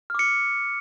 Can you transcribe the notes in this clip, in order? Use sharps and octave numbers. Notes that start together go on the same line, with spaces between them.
D6 F6 C#7